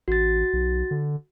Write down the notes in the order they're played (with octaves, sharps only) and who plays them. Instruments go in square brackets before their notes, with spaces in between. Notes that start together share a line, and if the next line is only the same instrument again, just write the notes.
[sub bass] A1 [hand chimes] F#4 A6
[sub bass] B1
D3